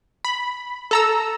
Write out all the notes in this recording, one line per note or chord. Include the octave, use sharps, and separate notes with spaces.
B5
A4 A#5 E6